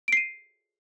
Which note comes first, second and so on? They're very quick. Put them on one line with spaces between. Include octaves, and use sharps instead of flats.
D7 C7 D#7